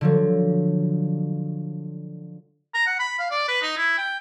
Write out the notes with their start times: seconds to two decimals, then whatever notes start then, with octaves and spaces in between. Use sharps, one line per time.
0.01 D3 F3 F#3
2.74 A#5
2.87 F#5
2.99 B5
3.19 F5
3.31 D5
3.48 B4
3.62 D#4
3.77 E4
3.98 G5